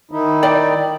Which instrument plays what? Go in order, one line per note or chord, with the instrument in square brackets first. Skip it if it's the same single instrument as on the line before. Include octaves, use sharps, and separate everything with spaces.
[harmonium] D#3 D#4 E4
[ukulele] D5 G5